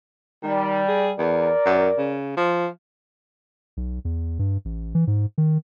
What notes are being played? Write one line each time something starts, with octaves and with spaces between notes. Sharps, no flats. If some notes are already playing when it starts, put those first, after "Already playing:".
D#3 G3
G#4
E2 A#4 D5
F#2
C#3
F3
B1
E2
G2
A1
E3
G#2
D#3